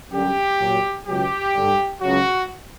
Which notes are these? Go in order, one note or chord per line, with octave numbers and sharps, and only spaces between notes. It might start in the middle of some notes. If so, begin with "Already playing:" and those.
F#2 D3 G3 G4
A#2 F#3
C#2 B2 F#3 G4
G2 D3 G3
C#2 C#3 F#3 F#4